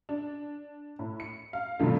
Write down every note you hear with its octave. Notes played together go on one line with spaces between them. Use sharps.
D4
A2
C#7
F5
G2 C3 D#3 F3 A3